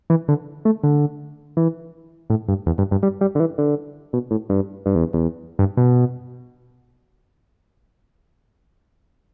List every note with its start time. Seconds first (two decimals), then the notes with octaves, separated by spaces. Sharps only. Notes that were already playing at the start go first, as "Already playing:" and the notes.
0.10 E3
0.28 D3
0.65 A3
0.83 D3
1.57 E3
2.30 A2
2.48 G2
2.66 E2
2.78 G2
2.91 G2
3.03 G3
3.21 G3
3.35 D3
3.40 E3
3.58 D3
4.13 B2
4.31 A2
4.50 G2
4.86 G2
4.95 E2
5.13 E2
5.59 G2
5.77 B2